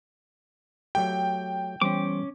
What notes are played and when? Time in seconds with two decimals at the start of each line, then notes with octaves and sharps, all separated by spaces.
0.95 F#3 A3 G4 G5
1.82 E3 G3 B3 C#4 C5 D6